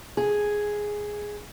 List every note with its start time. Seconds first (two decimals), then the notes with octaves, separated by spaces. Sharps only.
0.17 G#4